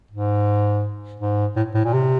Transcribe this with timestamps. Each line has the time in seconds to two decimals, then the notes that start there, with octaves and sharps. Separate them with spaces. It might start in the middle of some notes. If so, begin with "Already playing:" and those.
0.11 G#2
1.20 G#2
1.56 A2
1.75 A2
1.85 A#2
1.94 C3